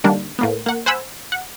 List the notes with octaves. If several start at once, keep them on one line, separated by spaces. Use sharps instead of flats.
D3 D#3 G3 A#3 D4
A2 A#3 B3
A#3 F#5
C5 F#5 G#5 B5 E6
F#5